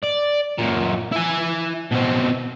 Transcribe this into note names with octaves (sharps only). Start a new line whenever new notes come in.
D5
F#2 A#2
E4 G#5
B2 C4